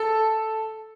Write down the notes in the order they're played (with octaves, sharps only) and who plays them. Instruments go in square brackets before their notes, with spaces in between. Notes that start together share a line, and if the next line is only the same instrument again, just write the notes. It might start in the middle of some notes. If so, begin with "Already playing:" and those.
Already playing: [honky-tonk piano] A4